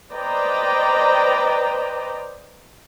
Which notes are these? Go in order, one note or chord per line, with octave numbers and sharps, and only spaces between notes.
B4 C5 D5 D#5 G5 A#5